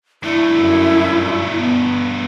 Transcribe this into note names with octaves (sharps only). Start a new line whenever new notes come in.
G2 A3 E4
F#2
B3